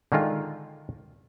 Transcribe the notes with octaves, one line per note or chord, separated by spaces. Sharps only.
D3 D#3 G#3 F4